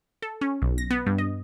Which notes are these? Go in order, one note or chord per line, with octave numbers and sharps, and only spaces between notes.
A4
C#4
B1
A#6
B3
G2
D#5